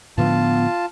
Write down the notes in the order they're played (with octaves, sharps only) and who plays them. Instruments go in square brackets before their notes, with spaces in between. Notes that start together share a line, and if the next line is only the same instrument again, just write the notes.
[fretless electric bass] A2 D3 F3 [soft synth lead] B3 [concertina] F4 A5